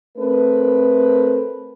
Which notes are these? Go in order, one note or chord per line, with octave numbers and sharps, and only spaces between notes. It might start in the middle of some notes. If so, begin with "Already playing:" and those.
A3 C4 A#4 B4